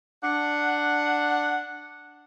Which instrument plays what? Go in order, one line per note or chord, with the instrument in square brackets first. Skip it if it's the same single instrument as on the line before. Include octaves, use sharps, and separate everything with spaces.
[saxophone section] D4 F#5